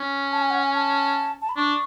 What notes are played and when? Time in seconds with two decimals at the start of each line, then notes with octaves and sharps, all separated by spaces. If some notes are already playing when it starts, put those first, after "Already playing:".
Already playing: C#4
0.32 A5
0.41 G#5
0.51 F#5
0.60 G#5
0.74 A5
1.42 A5
1.49 B5
1.56 D4 C#6